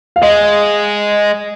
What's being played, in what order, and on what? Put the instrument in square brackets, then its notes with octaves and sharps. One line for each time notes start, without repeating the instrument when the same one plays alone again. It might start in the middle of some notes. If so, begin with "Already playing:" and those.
[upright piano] F5
[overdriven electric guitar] G#3 [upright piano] D#5